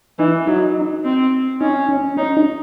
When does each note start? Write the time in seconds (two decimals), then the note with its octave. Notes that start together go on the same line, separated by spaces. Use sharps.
0.19 E3 D#4
0.47 F#3 D#4
1.04 C4
1.61 C#4 D#4
1.89 C#4
2.17 C#4 D#4
2.37 D#4